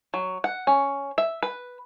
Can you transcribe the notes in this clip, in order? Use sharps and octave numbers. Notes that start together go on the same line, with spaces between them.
F#3
F#5
C#4
E5
B4